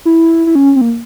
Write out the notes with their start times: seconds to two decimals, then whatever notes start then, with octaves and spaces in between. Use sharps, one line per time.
0.05 E4
0.47 E4
0.55 C#4
0.76 C4
0.81 A#3